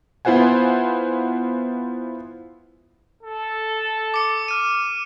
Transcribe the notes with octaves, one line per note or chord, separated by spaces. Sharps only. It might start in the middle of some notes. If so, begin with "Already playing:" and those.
B3 E4 F4 C5 F#5 G#5
A4
D6 C#7
F6 D#7